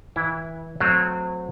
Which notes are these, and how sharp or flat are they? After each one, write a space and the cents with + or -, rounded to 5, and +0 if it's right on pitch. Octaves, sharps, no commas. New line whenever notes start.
E3 -25 E4 +0
F#3 -30 A3 +0 C4 -15